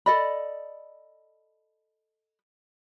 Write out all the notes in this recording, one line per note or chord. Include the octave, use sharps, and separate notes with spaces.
A4 D5 D#5 B5